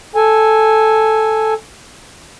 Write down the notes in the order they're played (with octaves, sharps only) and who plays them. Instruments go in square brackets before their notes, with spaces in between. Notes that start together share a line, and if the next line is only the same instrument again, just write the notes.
[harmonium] A4 G#5